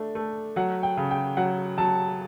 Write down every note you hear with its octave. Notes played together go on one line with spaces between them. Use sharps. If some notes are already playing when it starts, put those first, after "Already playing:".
Already playing: A3 D4
A3
F#3 F#5
G5
C#3
G5
F#3 F#5
F#3 A5